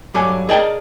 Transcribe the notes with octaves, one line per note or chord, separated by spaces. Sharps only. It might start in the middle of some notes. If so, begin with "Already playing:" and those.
G2 F#3 A4 G#5 D6
G#4 A#4 D5 D#5 G5 A5